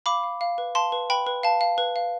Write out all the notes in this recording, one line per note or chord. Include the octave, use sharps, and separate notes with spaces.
F5 B5 D6
F5
F5
B4
F5 A5 C6
B4
B4 G5 B5
B4
F5 A5
F5
B4
F5